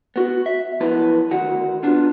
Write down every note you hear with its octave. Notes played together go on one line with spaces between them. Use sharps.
B3 F#4
E5
F#2 F3 B3 E4 B4 A5
D2 D#3 F#4 F#5
B3 D4 F4